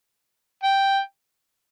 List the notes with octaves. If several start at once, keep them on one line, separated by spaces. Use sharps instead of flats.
G5